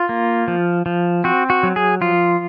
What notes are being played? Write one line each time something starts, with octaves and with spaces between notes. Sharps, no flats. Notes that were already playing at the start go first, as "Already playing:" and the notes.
Already playing: F4
A#3
F3
F3
C4 F#4
F#4
F#3
G#4
F3 F4